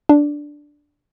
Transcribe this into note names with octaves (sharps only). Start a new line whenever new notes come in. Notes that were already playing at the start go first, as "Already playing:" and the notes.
D4